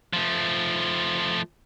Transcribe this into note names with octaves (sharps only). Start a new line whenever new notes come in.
F3 A3